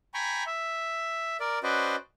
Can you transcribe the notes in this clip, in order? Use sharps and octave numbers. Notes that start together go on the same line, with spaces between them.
G5 G#5 A#5 B5 C#6
E5
A#4 D5
C#4 F#4 B4 C5 D5 D#5